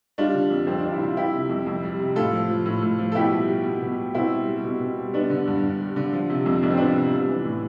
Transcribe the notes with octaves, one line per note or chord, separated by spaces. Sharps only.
G3 D4 F4
D3
F2
F2 C4
G3 D4
E4
D3 F4
G3 E4 G4
C3
F2
F2
G3
C3
A2 F4 A4
F3
F3
A2
A2
F3
A4
B2 E4 G4
G3
G3
B2
B2
G3
B2 C4 E4
G3
G3
B2
B2
G3
G3 B3 D4
D3
G2
G2
G3
D3
F3
C3
F2
F2 D4
C4
F3 B3 D4
C3
G3
E3
A2